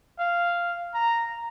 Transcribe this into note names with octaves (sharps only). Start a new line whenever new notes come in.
F5
A#5